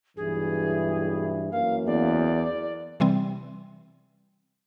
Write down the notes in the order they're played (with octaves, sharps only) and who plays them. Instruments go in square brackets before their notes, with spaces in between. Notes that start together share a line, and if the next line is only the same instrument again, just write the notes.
[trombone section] B1 G2 E3 [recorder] G#4
[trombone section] F#2 E3 A#3 [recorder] F5
[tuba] E2 [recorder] D5
[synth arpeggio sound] C3 E3 G3 C4